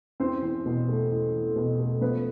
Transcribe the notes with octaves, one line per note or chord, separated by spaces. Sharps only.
E2 C4 C5
E2
B2
A3
E2
E2
B2
A3
F3 B3 B4